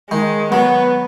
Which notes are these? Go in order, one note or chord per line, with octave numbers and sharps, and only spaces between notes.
D#3 G#3
F#3 B3